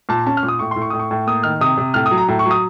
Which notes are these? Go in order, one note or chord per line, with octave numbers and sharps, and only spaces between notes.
A#2 A5
C#4 A5
F6
A#2
D#6
A2 C#6
A2 C6
C#6
A2 D#6
C#6
A2
A#3 D#6
D#3 F6
C3 D#6
C3
A2 F6
D#6
F#3
A#5
A2
C#6
F#3
D#6